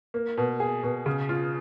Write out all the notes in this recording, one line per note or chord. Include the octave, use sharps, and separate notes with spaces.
A#3
B2
G#4
B2
C#3
F4